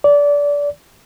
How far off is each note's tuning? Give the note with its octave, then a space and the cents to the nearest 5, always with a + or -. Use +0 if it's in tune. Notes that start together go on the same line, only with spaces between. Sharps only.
D5 -25